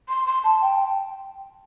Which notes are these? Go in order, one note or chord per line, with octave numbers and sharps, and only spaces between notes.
C6
C6
A5
G5